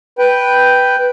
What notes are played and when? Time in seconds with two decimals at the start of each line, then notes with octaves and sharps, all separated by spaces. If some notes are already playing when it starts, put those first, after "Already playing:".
0.19 B4 G5